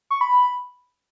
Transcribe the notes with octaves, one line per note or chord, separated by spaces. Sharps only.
C#6
B5